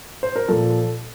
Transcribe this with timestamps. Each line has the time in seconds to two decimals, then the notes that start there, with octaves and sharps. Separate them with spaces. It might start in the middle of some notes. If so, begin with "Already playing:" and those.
0.23 C5
0.36 A#4
0.48 A#2 F3 A4